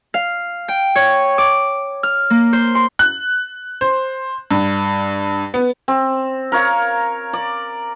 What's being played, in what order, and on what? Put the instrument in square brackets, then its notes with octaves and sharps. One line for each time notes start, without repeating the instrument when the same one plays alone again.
[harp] F5
G5
C#5
D6
F6
A#3
C5
C6
[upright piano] F#6
C5
G2
B3
[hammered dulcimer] C4
A#4 C#5 F5
D5